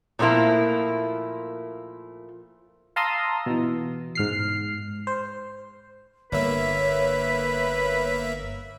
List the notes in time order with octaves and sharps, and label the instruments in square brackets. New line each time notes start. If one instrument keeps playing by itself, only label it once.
[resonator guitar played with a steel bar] A#2 F3 A3 A#3 E4
[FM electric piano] F5 A5 A#5 C6 D#6 E6
B2 E3
G#2 F6 C7
C5
[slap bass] G1 [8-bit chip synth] A#3 E5 [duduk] B4 [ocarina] C#5